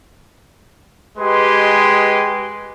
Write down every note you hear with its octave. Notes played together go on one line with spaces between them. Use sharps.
G#3 G4 B4 D#5 G#5 C6